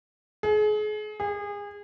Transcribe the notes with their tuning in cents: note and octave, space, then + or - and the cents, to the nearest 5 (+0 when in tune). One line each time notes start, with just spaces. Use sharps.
G#4 +35
G#4 -30